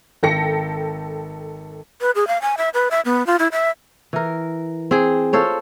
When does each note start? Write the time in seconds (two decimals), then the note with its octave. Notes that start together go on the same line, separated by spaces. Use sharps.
0.23 G#1 A4 G5 A#6 C#7
2.01 B4
2.15 G#4
2.28 F5
2.42 G#5
2.58 E5
2.74 B4
2.91 E5
3.05 B3
3.27 F4
3.39 E4
3.52 E5
4.13 E3 A#4
4.91 C4 G#4
5.33 F4 A4 C5 C#5